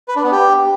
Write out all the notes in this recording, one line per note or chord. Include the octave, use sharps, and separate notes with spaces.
B4
D4
B3
G4